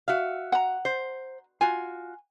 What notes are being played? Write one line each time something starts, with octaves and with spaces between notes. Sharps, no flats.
F#4 E5 F5
F#5 A#5
C5
F4 F#4 G#5